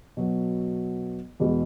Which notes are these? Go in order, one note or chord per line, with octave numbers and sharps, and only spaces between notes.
B2 F#3 B3
E2 B2 G#3 B3